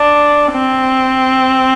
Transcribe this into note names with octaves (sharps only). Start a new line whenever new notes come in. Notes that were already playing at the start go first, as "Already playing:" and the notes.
Already playing: D4
C4